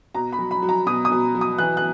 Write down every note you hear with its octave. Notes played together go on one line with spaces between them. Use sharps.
B2 A#5
B5
F#3
B5
F#3
A#5
B2 D#6
D#6
B2
F#3
D#6
E3 F#6
F#6